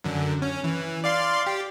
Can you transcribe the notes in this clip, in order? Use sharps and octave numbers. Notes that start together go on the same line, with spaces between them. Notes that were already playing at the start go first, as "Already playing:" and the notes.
F#2 D3
C#4
E3
D5 F5 C6
G4